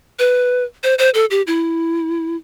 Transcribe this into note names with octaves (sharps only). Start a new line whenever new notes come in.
B4
C5
C5
A4
G4
E4